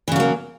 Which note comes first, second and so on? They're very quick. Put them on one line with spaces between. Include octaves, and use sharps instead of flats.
E3 C#3 F#3 A#3